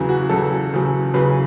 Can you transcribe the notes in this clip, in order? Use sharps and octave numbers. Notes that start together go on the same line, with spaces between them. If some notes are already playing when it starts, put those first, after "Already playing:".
Already playing: E2 C#3 F#3
F#4
E2 C#3 F#3 A4
E2 C#3 F#3
E2 C#3 F#3 B4